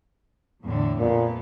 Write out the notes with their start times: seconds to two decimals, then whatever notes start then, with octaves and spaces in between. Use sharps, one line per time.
0.64 E2 A2 D3
0.99 F2 A#2 B3